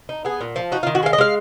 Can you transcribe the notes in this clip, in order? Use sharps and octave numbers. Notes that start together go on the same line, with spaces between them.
D#4
B3 G#4
A#2
F3
D#4 F#4
F4
D#3
F#4
G#3 F5
D#5
G#3 F5